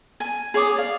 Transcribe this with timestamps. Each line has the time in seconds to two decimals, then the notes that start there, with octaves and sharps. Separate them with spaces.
0.20 G#5
0.54 G#4 C#5 D6 D#6
0.76 D5 F5